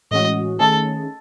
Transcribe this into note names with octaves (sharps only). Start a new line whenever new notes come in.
A2 E3 G#3 C#4 F#4 D#5
D#3 A3 C#4 G#4 A4